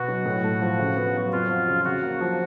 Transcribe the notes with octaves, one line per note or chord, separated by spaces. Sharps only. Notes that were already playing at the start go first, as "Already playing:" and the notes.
Already playing: B2 B3 F#4
F#3
A2
A3
F3
C#3
B3
F#3
F2 F4
F3
C#3
C#3 F#4
A#3
F3